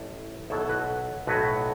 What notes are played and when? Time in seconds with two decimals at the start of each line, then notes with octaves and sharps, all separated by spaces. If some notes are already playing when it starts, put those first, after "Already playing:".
Already playing: A1 A2 F#3 E4 A4
0.50 B1 B2 F#3 E4 A4
0.62 A4
0.69 F#4 B4
1.27 B1 A2 F#3 F#4 B4